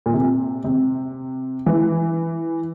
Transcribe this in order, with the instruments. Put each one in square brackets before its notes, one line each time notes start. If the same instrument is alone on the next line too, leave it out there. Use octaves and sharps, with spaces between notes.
[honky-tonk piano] A#2
C3
C3
E3